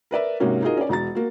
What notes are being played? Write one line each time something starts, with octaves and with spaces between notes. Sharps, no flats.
A#4 B4 D5 E5
G#2 C3 A#3 C#4 F#4
D#4 F4 F#4 G#4 A#4 D#5
C#4 D5
E1 F#4 A#5 A6
A#3 F#4